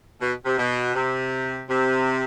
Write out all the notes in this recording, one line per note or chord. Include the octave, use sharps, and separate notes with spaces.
B2
C3
B2
C3
C3